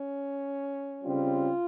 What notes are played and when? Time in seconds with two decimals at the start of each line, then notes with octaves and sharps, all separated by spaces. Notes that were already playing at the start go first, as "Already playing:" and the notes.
Already playing: C#4
1.04 C#3 G3 C4 F4